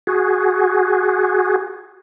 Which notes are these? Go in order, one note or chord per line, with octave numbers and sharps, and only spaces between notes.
F#4 G#4